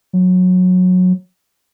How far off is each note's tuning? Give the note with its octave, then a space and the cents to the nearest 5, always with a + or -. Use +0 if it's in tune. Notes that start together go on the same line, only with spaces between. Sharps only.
F#3 -20